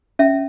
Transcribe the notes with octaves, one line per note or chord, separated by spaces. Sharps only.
C#4 E5